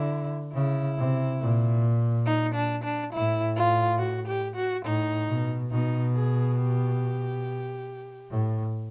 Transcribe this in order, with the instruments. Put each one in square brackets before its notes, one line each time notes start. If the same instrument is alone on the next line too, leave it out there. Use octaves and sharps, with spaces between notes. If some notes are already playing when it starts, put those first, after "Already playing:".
Already playing: [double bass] D3 [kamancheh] E4
[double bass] C#3 [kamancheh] E4
[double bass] C3
A#2
[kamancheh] D#4
D4
D4
[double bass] A2 [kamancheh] E4
[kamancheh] F4
F#4
G4
F#4
[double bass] A2 [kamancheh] D#4
[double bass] B2
[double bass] B2 [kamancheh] D#4
[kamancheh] G#4
G4
[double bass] A2